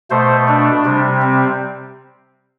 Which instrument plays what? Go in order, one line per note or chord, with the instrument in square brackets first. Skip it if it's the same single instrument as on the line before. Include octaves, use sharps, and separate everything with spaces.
[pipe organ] B2 A3 C5
D4
C3 G3
C4